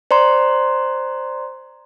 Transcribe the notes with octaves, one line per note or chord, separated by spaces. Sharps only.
C5 D5 A#5 C6